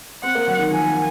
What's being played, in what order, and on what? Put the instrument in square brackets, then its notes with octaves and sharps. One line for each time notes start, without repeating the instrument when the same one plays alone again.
[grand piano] C4 [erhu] F#5
[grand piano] A#3
F#3
D#3
[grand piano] F3 [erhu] G#5